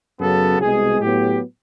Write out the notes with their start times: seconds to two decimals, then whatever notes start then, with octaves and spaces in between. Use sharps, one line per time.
0.20 F#2 C#3 F#3 B3 A4
0.60 C2 B2 G#3 G#4
1.01 A2 F#3 B3 G4